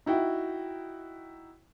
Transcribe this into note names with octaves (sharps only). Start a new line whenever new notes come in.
D#4 E4 F#4 G5